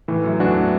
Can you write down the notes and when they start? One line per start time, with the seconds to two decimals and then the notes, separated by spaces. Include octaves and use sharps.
0.08 A2 E3
0.24 F#2
0.40 E2 A3 D4 F#4